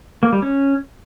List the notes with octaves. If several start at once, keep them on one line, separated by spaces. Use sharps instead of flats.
A#3
G3
C#4